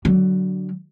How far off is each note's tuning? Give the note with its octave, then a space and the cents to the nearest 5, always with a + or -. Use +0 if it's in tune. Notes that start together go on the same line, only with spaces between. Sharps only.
D3 +0 F#3 +15